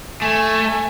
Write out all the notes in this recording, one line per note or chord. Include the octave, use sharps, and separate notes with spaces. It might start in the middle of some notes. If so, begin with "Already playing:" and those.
A3 G#5